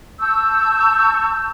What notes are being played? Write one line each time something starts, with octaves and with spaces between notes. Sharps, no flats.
A5 C#6 E6 G6